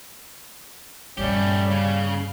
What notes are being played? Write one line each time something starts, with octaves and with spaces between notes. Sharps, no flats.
G2 A#2 G3 A3 C#4 G4
C#3 F5